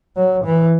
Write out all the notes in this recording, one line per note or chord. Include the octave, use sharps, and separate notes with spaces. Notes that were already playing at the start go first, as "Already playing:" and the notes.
F#3
E3